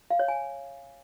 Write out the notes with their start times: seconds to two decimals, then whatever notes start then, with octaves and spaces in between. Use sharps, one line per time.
0.11 F5
0.19 C#5
0.28 G#5